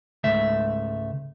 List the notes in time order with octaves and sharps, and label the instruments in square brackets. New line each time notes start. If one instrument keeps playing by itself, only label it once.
[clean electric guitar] C#2 G#2 A3 E5